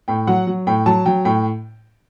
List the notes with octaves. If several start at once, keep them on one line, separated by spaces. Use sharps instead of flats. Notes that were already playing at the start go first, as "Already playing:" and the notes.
A2 G5
F#3 F#5
F#3
A2 G5
F#3 A5
F#3 G5
A2 G5